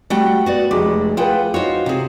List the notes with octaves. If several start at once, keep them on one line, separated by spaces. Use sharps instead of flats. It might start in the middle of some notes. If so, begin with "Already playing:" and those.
G3 A3 F#4 F#5 G5
B3 F#4 B4 D5
F1 G#3 A3 D6
F4 G#4 B4 C5 F#5 G5
D#4 F4 F#4 C5 C#5
C3 G#4